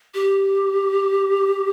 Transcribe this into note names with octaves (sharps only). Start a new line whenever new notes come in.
G4